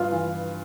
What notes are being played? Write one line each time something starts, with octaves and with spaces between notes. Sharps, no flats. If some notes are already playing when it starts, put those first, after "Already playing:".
Already playing: G2 F4
E3